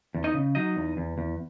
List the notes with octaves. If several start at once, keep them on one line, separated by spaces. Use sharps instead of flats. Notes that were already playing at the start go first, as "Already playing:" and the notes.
E2
D#4 D#5
C#3
F#3 D#4 D#5
E2
E2
E2